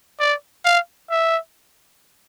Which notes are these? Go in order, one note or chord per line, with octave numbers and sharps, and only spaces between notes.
D5
F5
E5